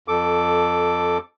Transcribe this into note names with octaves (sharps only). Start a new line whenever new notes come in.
F2 A4 D6